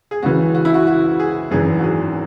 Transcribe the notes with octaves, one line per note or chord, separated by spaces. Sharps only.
G#4
C#2 C#3 E3 F#4
F#4
E4
F#4
F#4
G#4
G#1 F#2 E3 G#4
F#4
G#4